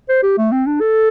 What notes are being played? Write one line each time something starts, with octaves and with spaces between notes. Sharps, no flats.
C5
G4
A3
C4
D4
A4